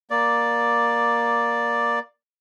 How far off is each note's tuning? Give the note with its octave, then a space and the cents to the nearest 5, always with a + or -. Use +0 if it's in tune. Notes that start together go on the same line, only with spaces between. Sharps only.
A#3 +10 D5 +0